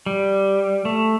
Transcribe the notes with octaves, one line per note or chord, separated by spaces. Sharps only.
G3
A3